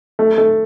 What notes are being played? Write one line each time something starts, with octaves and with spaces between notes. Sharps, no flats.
A3
A3